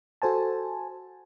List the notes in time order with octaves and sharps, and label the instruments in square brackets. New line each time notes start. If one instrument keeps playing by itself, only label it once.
[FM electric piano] F#4 A4 C5 G#5 A5